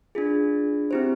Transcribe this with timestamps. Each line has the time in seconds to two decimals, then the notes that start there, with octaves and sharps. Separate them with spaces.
0.15 D4 F4 G#4
0.91 C4 E4 G4 C5